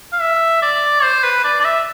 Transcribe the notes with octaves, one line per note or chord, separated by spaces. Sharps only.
F5
E5
D5
C5
B4
D5
D5
E5